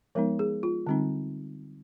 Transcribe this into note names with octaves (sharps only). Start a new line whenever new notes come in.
F3 G#3 B3 D#4 A#4
G#4
F4
D3 G3 C4 D#4